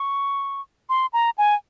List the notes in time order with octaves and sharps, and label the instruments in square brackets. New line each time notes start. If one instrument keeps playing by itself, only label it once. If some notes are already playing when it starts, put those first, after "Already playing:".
Already playing: [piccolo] C#6
C6
A#5
G#5